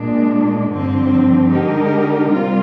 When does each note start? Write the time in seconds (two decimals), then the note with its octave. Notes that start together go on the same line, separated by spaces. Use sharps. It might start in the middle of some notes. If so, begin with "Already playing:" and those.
Already playing: A#2 G#3 D4
0.70 G2 D3 F3 C4
1.50 D3 G#3 D#4 G4 A#4
2.30 C3 G3 C4 F4